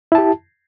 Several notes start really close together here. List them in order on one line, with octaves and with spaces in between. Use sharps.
E4 A5 G4